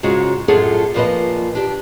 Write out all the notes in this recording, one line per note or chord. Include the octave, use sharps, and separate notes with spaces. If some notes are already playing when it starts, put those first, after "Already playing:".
G#2 C#3 G#3 F4 F#4
F#2 A2 F4 G#4 A4 F#5
A#2 F3 B4 D#5
D4 G4